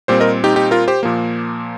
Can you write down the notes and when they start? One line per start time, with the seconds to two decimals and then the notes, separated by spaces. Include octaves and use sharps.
0.08 A#2 G3 C4 G4 C5
0.20 A#4 D#5
0.44 D#4 G4
0.56 D#4 G4
0.71 F4 A#4
0.88 G4 C5
1.03 A#2 F3 A#3